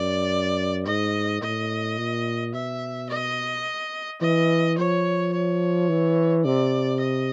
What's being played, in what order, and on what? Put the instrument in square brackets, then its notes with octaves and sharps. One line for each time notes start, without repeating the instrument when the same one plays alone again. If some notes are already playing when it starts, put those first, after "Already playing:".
Already playing: [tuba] F#2 [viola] D5
[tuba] G#2 [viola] D#5
[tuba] A2 [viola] D#5
[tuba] A#2
[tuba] B2 [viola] E5
[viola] D#5
[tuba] E3 [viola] D#5
[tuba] F3 [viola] C#5
[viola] C#5
[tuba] E3
[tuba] C3 [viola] D5
[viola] D#5